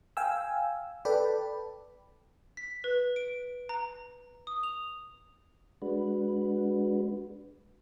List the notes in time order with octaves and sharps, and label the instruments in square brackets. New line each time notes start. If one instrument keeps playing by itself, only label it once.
[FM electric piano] F5 G5 G#5 E6
A4 B4 D5 G5 A5 B5
[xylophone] B6
B4
D7
A#5
D#6
F7
[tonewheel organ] G#3 D4 F#4 B4